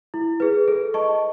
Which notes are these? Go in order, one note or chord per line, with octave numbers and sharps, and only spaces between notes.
E4
G#4 B4
A4
D#5 A5 C#6